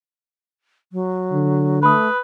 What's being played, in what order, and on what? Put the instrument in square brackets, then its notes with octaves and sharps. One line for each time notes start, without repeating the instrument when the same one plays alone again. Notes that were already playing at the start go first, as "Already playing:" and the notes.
[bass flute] F#3
[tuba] D3
[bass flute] A3 [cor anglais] B4 [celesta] B5 D#6